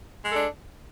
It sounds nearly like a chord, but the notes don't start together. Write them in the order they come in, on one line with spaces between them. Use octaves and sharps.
G#3 A4 D4